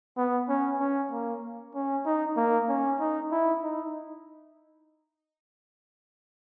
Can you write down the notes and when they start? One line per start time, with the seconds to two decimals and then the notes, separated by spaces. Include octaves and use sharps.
0.17 B3
0.48 C#4
0.80 C#4
1.11 A#3
1.74 C#4
2.05 D#4
2.37 A#3
2.68 C#4
3.00 D#4
3.31 E4
3.62 D#4